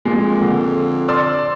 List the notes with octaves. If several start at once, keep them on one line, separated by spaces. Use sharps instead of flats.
F2 A#2 G#3
D3
D5 C6 E6